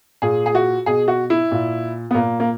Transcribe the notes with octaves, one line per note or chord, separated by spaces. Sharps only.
A#2 G#4
G#4
F#4
B2 G#4
F#4
E4
A#2
B3
A#2 A#3
A#3